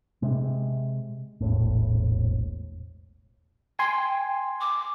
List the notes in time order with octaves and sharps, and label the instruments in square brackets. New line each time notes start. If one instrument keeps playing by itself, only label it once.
[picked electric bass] C3 G#3
E1 A#1 A2
[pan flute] G5 [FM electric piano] G#5 C6
[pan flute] D6